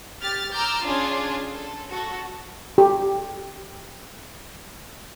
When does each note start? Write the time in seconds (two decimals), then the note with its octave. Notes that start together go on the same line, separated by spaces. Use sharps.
0.21 G4 F6 A6
0.53 A#5 D6 E6 F6 G6
0.83 C#4 D4 F4 G#4 C#5
1.51 A4
1.89 F#4 A4
2.78 G4 A4